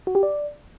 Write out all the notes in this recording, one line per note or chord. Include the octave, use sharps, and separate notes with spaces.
F#4
G4
D5